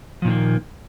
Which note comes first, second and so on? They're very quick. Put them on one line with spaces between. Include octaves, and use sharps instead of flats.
F3 A#2 D#3 A#3